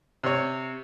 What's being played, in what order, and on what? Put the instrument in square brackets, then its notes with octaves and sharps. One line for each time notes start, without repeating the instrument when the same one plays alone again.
[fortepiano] C3 C#5